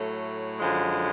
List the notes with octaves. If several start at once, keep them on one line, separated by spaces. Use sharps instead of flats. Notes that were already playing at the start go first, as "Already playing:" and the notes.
Already playing: A2 F#3 A3
F#2 D3 F3 G#3